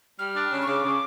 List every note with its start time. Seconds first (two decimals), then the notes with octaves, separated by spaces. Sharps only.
0.19 G3 F6
0.36 D4
0.51 C#3
0.61 C#6
0.67 C#3 D6
0.84 C#3